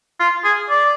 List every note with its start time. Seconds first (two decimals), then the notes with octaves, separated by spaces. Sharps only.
0.20 F4
0.44 G#4
0.70 D5